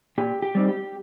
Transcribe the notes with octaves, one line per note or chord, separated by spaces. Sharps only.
A#2 G4
G4
G3 C4 D#4
G4